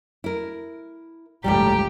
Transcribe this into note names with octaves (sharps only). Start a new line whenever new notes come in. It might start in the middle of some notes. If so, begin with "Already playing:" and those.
E4 A#4
G1 C#2 A2 F3 G3 G4 A#5